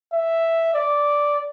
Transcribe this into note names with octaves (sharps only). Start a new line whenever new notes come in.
E5
D5